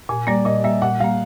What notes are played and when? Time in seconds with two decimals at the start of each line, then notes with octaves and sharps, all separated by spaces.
0.09 A#2 G#5
0.27 G3 A#3 D5
0.45 A#2 D#5
0.64 G3 A#3 E5
0.82 A#2 F#5
1.00 G3 A#3 F5